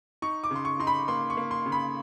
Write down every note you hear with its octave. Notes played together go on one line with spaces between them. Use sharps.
D#4 C#6
D6
C#3 C6
C#6
D#4 C6
B5
A#3 C6
C#6
A#3
C6
C#3
B5